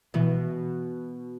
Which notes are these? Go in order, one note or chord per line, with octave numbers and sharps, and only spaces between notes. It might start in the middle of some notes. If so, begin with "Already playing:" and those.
B2 E3